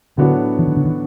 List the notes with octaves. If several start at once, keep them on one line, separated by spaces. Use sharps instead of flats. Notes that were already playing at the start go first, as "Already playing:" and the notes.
A2 D3 F#3 B3 D4 F#4
E3
D#3
D3
D#3